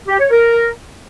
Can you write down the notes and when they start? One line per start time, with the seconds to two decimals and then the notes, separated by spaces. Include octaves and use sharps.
0.08 G4
0.19 C#5
0.30 A#4